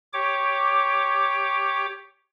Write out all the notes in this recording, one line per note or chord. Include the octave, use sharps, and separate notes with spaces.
G4 C#5 D6